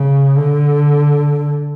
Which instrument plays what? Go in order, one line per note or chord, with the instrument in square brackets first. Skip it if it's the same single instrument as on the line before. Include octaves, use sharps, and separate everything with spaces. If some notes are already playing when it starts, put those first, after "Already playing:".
Already playing: [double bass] C#3
D3